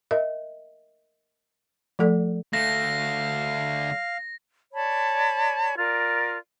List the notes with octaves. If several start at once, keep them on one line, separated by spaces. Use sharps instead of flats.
A#4 D#5 E5
F3 A3 A4 D5
D3 A3 F5 A#6
C#5 D5 A5 B5
F4 A#4 D5